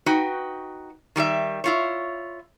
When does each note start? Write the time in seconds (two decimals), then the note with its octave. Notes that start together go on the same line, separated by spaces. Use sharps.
0.06 D#4 F#4 B4 G5
1.16 D#3 G3 G4 E5
1.64 E4 F4 C#5